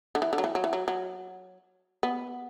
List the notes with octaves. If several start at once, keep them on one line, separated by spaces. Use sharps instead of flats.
D3
E3
D3
F#3
E3
F#3
E3
F#3
F#3
B3